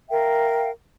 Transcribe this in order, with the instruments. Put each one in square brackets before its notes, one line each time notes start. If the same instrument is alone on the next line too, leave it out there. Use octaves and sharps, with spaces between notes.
[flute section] A#4 E5 F5 G5